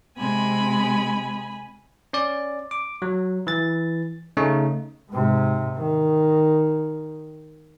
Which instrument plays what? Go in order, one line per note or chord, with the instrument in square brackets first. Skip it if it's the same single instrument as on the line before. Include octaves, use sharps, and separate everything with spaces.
[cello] C3 G#3 [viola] G#5 B5
[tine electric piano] C#4 D5
D6
F#3
E3 A6
C#3 A3 C#4 D#4
[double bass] G#2 C3
D#3